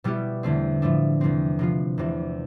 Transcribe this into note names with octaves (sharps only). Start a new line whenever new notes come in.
B2 G3 B3 E4 G4
E2 D3 A3 C4
A2 F3 A3 D4
E2 C3 G3 C4
C3 F3 B3 F4
E2 C3 E3